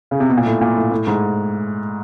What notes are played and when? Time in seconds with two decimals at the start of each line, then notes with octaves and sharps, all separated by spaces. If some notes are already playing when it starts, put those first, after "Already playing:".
0.11 C#3
0.20 C3
0.29 B2
0.37 A#2
0.46 A2
0.61 A#2
0.77 A2
0.91 A2
1.07 G#2